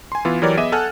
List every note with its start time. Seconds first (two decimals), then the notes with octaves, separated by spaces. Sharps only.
0.12 G#5 C6
0.25 E3 B3 F4
0.42 E3 F#3 G4 A#4 C#5 D5
0.57 B3 G#4 D#5 E5 D6 D#7
0.72 A4 F#5 G#5 A5 F6 F#6